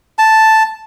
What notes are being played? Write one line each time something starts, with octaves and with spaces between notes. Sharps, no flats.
A5